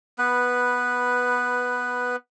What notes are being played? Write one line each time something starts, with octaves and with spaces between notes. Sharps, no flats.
B3 B4